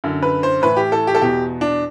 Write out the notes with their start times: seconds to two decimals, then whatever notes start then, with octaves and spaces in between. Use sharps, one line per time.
0.04 F#2 D3
0.22 B4
0.43 C5
0.62 A2 E3 B4
0.77 G4
0.92 A4
1.07 G4
1.15 A4
1.21 E2 B2 G4
1.61 D4